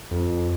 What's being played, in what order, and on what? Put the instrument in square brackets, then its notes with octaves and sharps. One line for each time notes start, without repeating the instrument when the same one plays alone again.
[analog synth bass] F2